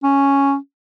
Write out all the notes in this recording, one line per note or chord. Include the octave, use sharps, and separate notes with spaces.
C#4